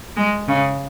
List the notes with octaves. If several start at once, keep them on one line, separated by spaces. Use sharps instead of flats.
G#3
C#3